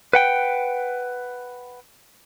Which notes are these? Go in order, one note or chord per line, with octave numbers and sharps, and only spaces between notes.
B4 F#5 G5